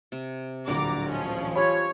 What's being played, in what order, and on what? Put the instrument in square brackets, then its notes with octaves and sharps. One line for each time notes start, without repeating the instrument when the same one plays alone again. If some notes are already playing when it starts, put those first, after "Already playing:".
[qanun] C3
[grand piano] D1 A#1 [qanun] D3 G3 [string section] A#5 D6
[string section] E3 F3 C#4 [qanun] D#5
[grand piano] F4 G4 B5 [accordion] C#5